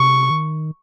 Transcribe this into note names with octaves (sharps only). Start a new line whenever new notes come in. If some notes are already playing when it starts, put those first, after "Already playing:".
Already playing: C3 C#6
D#3